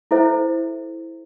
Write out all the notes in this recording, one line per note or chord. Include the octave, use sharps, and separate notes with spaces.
E4 A4 C5 E5